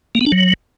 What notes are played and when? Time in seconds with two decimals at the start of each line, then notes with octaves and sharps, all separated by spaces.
0.15 A#3
0.21 B3
0.26 D4
0.32 F#3